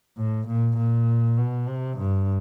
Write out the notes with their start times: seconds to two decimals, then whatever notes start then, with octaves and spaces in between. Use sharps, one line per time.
0.17 A2
0.48 A#2
0.77 A#2
1.38 B2
1.68 C3
1.98 G2